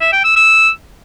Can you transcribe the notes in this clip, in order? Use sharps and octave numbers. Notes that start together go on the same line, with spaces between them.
E5
G5
E6
E6